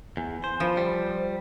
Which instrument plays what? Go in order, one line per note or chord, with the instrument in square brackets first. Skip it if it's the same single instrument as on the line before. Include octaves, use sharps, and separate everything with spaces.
[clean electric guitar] E2 [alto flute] G#5
[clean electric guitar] C5
[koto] F3 [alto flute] B5
[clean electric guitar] G3 [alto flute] C5